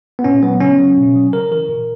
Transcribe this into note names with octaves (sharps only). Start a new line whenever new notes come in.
B3
A#2 C#4
F#3 B3
C#3 C#4
F#3
B2
F#3
C#3 A#4
E3 A#4
A#2